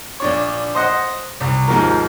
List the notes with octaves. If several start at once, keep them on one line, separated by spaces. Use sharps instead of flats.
A#1 D4 C#5
C5 D#5 F#5
C2
D#2 G#2 F3 A#4